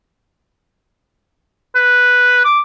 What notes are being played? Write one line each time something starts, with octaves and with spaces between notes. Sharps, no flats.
B4
D6